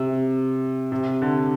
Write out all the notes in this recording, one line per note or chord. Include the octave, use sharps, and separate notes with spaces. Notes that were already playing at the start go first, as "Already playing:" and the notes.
Already playing: C3
C3
D3